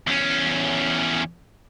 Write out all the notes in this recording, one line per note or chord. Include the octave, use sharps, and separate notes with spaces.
E2 C#4